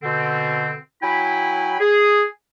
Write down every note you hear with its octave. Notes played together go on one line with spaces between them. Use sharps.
B2 D3 C4
F#3 E4 G5 G#5 B5
G#4